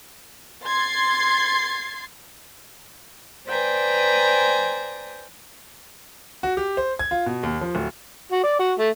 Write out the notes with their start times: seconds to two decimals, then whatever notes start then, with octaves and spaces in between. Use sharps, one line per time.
0.65 C6 G#6 A6 C7
3.47 B4 C5 D5 G5 G#5 A#5
6.43 F#4
6.57 G4
6.77 C5
6.99 G#6
7.11 F4
7.26 B2
7.43 D#2
7.61 F3
7.75 D1
8.32 F#4
8.44 D5
8.59 F#4
8.79 A3